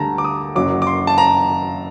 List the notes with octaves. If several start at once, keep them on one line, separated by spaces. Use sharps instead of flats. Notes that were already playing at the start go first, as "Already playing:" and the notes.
Already playing: D2 D3 G3 A5 A#5
D6
D#6
F#1 F#2 F#3 D6
D6
C6
A5
A#5